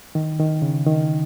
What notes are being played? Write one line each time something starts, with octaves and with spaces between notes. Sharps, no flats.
D#3
D#3
C#3
D#3